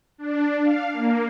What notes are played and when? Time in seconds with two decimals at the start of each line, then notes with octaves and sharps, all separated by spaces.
0.18 D4
0.63 F5
0.93 A#3